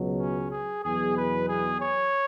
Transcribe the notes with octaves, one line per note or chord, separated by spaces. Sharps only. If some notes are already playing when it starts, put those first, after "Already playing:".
Already playing: C#2 B2 F#3
C#4
G#4
E2 B2 F#3 G#4
B4
G#4
C#5